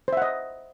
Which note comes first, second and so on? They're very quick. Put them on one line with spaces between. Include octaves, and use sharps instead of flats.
C5 E5 F#5 D#5